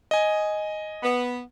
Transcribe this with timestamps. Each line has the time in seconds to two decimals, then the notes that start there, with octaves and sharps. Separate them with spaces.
0.11 D#5 G#5
1.03 B3